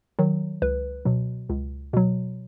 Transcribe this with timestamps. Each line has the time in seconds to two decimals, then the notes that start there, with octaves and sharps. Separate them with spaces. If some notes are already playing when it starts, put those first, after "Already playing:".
0.19 D#3 F#3
0.62 C#2 B4
1.05 B2 F#3
1.49 C#2
1.93 B2 F#3